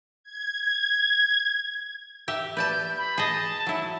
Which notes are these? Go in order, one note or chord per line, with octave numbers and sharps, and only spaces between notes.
G#6
G4 E5
B4 D5 A5 G6
B5
G#4 D#5 A5
F#3 E4